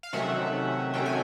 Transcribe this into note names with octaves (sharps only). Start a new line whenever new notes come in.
F5
C3 D#3 F#3 A3 C#4 E5 F#5
C3 D#3 F#3 A3 C#4 G5
G#5